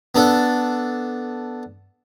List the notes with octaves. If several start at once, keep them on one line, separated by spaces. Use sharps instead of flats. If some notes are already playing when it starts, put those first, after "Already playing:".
B3 D4 A4